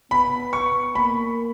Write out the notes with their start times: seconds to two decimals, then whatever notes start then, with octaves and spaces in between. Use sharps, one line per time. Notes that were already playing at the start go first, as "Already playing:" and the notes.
0.11 B3 B5
0.53 C#6
0.95 A#3 B5